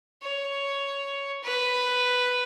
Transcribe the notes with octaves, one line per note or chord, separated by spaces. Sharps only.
C#5
B4